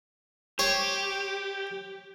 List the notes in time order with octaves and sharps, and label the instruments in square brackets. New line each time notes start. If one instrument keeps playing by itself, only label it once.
[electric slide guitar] G4 [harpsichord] C5 C#5